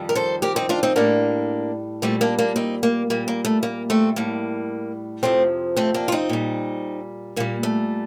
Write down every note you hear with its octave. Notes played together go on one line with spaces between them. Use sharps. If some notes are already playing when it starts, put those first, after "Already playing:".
Already playing: F2 D#3 G3
A#4
A4 C5
G4 A#4
C4 D#4
D4 F4
C4 D#4
A2 G3 A#3 D4
A#2 G3 A3 C4
A#3 D4
A#3 D4
C4 D#4
A#3
A#2 G3 A#3
A#3
A3
A#3
A3 C4
A2 G3 A#3
F2 C3 F3 A3 C4
A3 C4
A#3 D4
F4
C4 D#4
A#2 G3
A#2 G3 A#3
A3